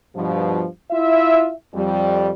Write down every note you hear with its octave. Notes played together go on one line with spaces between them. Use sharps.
G2 B2 F3
E4 F4 E5
F2 G3